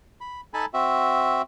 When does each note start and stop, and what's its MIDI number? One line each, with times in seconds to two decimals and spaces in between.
0.21 0.41 83
0.54 0.66 63
0.54 0.66 69
0.54 0.66 80
0.54 0.66 81
0.54 0.66 83
0.74 1.42 60
0.74 1.42 66
0.74 1.42 76